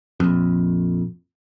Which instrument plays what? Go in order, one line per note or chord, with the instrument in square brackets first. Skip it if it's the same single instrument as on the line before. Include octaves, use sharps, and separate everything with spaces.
[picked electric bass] A#1 F2